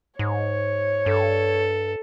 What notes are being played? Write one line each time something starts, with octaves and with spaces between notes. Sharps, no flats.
G#2 C#5
G2 A4